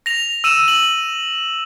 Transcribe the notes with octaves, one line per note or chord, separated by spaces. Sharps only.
A#6 F7
E6 D#7 E7
F#7